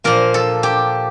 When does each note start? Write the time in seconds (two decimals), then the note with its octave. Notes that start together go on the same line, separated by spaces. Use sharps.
0.04 A#2 F3 A#3 A#4
0.34 A4
0.63 G4